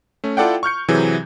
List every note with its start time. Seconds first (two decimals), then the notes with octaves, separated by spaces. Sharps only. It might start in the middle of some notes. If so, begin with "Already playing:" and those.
0.24 A3 C#4
0.37 E4 F4 A4 D5 F#5 G5
0.63 C#6 F6 G6 C#7
0.88 C3 E3 F#3 G#4